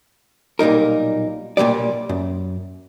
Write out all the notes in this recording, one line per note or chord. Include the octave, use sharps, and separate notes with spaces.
B1 A#2 G3 D#4 A#4
B1 A#2 F3 G3 D5
F#2